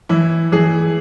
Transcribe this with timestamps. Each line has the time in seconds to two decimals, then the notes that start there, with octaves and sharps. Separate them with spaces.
0.09 E3 E4
0.52 E3 G#4